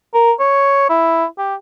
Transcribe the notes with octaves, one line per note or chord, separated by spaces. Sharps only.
A#4
C#5
E4
G4